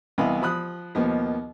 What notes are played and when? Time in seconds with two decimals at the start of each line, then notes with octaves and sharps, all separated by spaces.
0.18 C2 E3 B3 D#5 F5 B5
0.42 F3 B5 D#6 F#6
0.95 D#2 B2 F3 A#3 B3